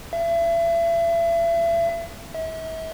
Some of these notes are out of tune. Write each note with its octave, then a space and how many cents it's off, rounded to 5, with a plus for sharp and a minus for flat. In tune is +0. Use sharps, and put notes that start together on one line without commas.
E5 +35
E5 -40